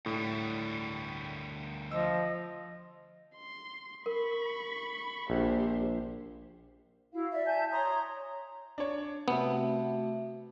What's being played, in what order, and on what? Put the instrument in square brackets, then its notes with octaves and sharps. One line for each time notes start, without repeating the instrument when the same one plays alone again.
[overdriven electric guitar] D2 G3 [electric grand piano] A2
[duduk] F3 [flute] D#5 [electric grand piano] E6
[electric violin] C6
[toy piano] A#4 [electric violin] B5 C#6
[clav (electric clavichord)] A#1 [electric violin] G4 C5
[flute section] E4 F#4 F5
[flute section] D5 [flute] E5
[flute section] G#5 A5 G6
[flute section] C#5 C6 D#6 [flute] A#5
[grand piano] D4 C#5
[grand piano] C3 [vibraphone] A3 F#4 E5 [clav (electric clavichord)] B3